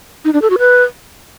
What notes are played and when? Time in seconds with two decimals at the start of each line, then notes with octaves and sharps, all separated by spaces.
0.25 D#4
0.33 D4
0.42 A4
0.50 F#4
0.59 B4